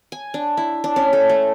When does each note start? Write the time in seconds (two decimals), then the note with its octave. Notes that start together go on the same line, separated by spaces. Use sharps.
0.12 G#5
0.34 D4
0.57 E4
0.84 D4
0.96 C#4
1.13 A4
1.29 A3